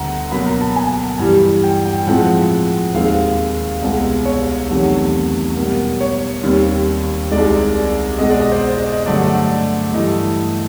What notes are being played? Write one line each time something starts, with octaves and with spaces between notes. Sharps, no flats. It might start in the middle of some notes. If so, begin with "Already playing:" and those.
Already playing: D2 D3 G3 B3 F#5 A#5
B2 F#3 A#3 B5
A#5
A5
G#5
G2 E3 G3
G5
G5
A2 F3 G#3 C4 F#5
D#2 D#3 G#3 C4 F5
C2 B2 G#3 B3
C#5
E2 C3 D#3 F#3 A3
B2 G3 A#3
C#5
D#2 D#3 G3 C4
C2 C3 D#3 G#3 D5
B2 G#3 B3 D#5
D5
D#5
C5
D5
D#5
D#5
G2 D3 F#3 A3 D5
G2 E3 A3 D#5